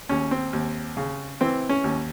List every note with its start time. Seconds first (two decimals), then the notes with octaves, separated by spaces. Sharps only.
0.09 D#2 C#4
0.31 C4
0.53 D#2
0.97 C#3
1.41 E3 C4
1.69 C#4
1.84 D#2